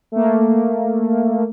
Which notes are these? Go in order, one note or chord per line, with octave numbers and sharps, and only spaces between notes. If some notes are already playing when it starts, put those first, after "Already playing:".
A3 A#3